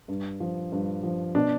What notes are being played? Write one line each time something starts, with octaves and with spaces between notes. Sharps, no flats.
G2
F3
G2
F3
B2 D4